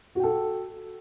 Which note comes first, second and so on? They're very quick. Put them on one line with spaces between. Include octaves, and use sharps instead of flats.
F#4 G5 A4